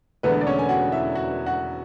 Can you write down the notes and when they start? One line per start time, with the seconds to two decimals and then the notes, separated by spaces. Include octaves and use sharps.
0.23 E1 E2 D3 A3 B3 B4
0.41 D5
0.47 C#4 C#5
0.59 G#5
0.69 F#4 F#5
0.92 E4 E5
1.15 F#4 F#5
1.46 F#4 F#5